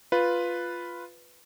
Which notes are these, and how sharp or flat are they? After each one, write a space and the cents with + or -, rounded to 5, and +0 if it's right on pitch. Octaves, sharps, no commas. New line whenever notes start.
F4 +0 B4 +0